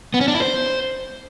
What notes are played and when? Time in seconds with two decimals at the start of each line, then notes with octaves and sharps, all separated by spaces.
0.14 B3
0.21 C#4
0.28 D4
0.35 E4
0.42 C5